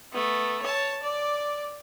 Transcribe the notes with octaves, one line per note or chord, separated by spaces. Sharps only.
A3 B3
C#5 A5
D5 D6